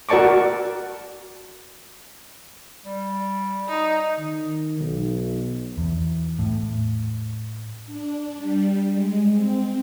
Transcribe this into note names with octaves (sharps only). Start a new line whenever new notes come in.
F#4 A#4 D5 A5 C#6 D6
G3
D#4
D#3
B1
E2
A2
D4
G3
G#3
C4